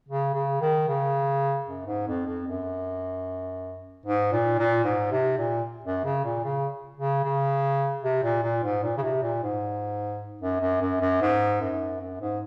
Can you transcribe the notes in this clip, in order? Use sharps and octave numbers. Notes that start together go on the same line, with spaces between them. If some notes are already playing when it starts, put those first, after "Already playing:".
C#3
C#3
D#3
C#3
F#2
G#2
F2
F2
F#2
G#2
A#2
A#2
G#2
C3
A#2
F#2
C#3
A#2
C#3
C#3
C#3
C3
A#2
A#2
G#2
A#2
C#3
C3
A#2
G#2
F#2
F#2
F#2
F#2
G#2
F#2
F#2
G#2